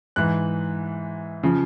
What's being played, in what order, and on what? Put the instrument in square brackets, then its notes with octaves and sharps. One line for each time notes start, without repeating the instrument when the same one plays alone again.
[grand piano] G#2 E3 F#6
C#3 F3